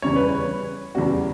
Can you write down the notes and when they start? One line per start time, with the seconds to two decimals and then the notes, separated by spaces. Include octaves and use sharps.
0.02 E2 C#3 G3 C#5
0.16 B4
0.29 C#5
0.95 E2 C#3 G3 F#4
1.08 G4